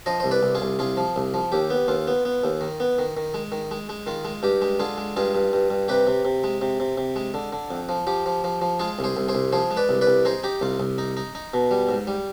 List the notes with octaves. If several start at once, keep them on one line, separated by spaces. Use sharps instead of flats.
F3 C5 D#5
C2 C5
B4 D5
C2
F4 G#4
C2
C2 F4 G#4
F3
C2
F3
D#2 G4
B3
D#2 F4
B3
B3
D#2
D#3
B3
D#3
D#3
G#3
D#3
G#3
G#3
D#3 F4
G#3
G2 G4
G#3
D3 F4 G#4
G#3
G2 F4 G#4
G2
G2
G2
C3 G4 B4
C3
C3
G#3
C3
C3
C3
G#3
D3
D3
F2
F3
F3 G4
F3
F3
F3
G#3 F4 G#4
C2
G#4 C5
C2
G#4 C5
C2
F3 G#4 C5
G#3
B4 D5
C2
B4 D5
C2
D#4 G#4 C5
D#4 G4
C2 F4
C2
D#4
D#4
D#4
B2
G3
G#2
G3